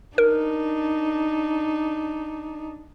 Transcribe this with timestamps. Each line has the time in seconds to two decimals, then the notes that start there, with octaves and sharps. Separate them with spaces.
0.18 D4 D#4 A#4